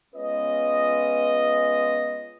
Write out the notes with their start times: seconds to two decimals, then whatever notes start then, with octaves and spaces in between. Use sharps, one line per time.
0.15 G#3 B3 C#4 F4 B4 D#5